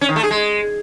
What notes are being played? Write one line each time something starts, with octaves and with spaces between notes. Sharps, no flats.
C#4
D#3
A3
G#4
G#3